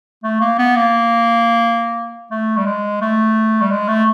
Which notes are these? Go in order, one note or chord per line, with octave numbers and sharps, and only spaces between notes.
A3
A#3
B3
A#3
A3
G3
G#3
A3
G3
G#3
A3